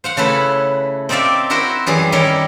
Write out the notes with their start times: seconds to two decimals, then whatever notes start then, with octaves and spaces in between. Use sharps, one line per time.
0.04 C5 F5 F#5
0.17 C#3 A3 E4 B4
1.09 C4 D#4 A#4 D5 E5 F5
1.50 E4 F#4 A#4 C5 E5
1.86 F#2 E3 G3 G#4
2.12 D#3 G3 C#4 E4 A#4 C#5